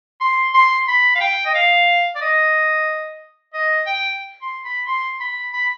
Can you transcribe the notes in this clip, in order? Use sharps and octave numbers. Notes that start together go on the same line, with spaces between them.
C6
C6
B5
F5
G5
D#5
F5
D5
D#5
D#5
G5
C6
B5
C6
B5
B5